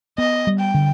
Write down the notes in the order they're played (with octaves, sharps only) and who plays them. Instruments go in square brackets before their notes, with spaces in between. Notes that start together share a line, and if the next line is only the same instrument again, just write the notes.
[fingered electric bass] B3 [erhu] D#5
[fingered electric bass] G3
[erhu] G5
[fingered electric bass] D3